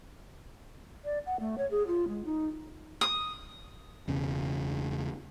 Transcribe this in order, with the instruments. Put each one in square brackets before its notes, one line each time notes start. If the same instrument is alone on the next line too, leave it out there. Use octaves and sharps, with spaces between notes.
[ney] D5
F#5
A3
C#5
G#4
F4
G#3
D#4
[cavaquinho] D#6
[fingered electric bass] E1 C#3